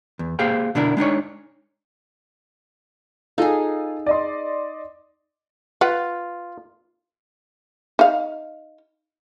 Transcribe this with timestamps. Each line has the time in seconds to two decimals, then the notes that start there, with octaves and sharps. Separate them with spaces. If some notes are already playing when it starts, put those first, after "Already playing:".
0.19 E2
0.39 A#3 G4 G#4 C5 F5 G5
0.75 B2 D3 B3 D4 E4 A#4
0.97 G#3 D4 D#4 C#5
3.38 D#4 F4 G#4 A4 F5
4.06 D5 D#5 C6
5.81 F4 B4 F#5
7.99 D#4 F5